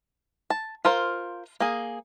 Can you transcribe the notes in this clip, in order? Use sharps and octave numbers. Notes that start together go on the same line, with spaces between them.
A5
F4 A#4 C5 F5
A#3 G#4